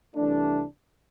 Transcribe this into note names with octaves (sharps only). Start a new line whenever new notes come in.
C2 C3 E3 A3 D4